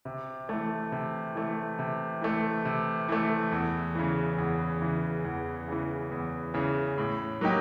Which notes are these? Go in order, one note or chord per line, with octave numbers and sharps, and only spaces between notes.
C3
E3 A3
C3
E3 A3
C3
E3 A3
C3
E3 A3
E2
C#3 E3
E2
C#3 E3
E2
C#3 E3
E2
C#3 E3
A2
F#3 A#3 D#4 G4